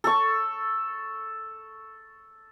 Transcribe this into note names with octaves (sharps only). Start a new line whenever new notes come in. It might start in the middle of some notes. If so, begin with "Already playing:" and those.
A4 C#6